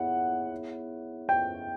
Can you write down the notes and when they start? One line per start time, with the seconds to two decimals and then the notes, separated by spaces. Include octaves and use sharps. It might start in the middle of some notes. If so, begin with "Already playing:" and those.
Already playing: B3 E4 G#4 C#5 E5 F#5
1.29 G5